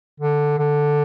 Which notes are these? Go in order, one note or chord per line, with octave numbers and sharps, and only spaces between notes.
D3
D3